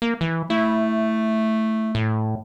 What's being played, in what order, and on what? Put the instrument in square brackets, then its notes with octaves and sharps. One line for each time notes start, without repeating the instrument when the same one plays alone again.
[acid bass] A#3
E3
[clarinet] A3 [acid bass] E4
[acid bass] A2